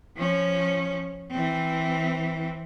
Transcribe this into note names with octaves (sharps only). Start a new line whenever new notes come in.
F3 C#4
E3 C4